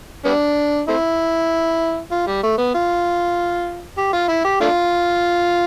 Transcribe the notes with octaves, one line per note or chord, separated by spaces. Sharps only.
G3 B3 D4
A3 C4 E4
F4
G3
A3
B3
F4
G4
F4
E4
G4
A3 D4 F4